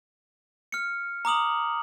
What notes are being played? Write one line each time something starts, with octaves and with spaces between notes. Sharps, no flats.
F6 C#7
A#5 D6 D#6 F#7